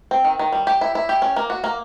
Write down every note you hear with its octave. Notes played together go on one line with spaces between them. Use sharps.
C4
D#3
D#3
G3
G4
E4
E4
G4
C#4
A#3
F#4
A#3